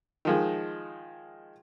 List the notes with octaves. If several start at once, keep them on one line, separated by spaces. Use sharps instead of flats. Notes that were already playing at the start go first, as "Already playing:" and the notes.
D#3 F3 G#3